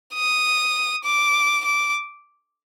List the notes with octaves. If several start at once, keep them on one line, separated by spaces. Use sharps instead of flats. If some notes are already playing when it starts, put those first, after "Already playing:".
D#6
D6
D6